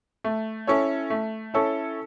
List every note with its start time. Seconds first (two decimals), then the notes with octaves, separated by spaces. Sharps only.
0.24 A3
0.67 C#4 E4 A4 C#5
1.10 A3
1.54 C#4 E4 A4 C#5